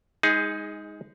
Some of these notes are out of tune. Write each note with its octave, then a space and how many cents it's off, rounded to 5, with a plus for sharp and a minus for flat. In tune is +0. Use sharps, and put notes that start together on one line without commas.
G#3 -20 D#4 +15 G#4 +0